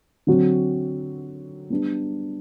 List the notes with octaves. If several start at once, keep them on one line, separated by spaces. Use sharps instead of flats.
D3 F#3 C4 F#4
G3 B3 D4